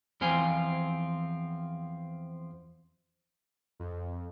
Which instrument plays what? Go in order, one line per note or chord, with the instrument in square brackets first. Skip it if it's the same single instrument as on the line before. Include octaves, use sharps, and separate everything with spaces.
[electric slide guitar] E2 F3 C4 F4 G#5
[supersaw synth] F2